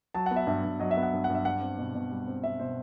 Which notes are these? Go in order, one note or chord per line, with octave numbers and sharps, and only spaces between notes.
F#3 A5
B3 F#5
E5
G2 E5
G2
F#3 D#5
E5
B3
F#5
G2
F#5
G2 E5
G3 F#5
C4
B2
B2
G3
C4
B2 E5
B2 C5